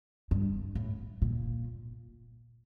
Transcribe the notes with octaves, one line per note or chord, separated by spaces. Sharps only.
G2
A2
A#2